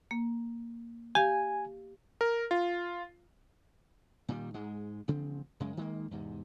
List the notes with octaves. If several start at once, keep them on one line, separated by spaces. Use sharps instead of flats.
A#3
G4 F5 G#5
A#4
F4
A#2 D#3 F3 G3
G#2 G#3
A1 C#3 F3 C4
F#2 C#3 G#3
D#3 G#3 A#3
E2 G#2 C3